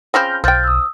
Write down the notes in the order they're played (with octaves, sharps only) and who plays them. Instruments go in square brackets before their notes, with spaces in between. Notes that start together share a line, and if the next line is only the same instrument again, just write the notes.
[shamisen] C#3 F3 C4 [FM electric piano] B5 F6 G6 [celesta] A#6
[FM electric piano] B1 [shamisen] F3 G5 [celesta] F6 G6 A6
[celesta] D#6 E6